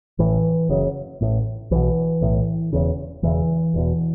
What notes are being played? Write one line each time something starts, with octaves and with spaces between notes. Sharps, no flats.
A1 A2 E3
F#1 F#2 C#3
A1 A2
B1 B2 E3
B1 A2
E1 E2 C#3
E1 E2 C#3 E3
E1 E2 B2